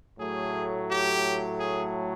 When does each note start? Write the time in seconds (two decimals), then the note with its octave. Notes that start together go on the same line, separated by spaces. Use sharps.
0.18 A2 F#3 A3 G#4
0.89 G4
1.59 G#4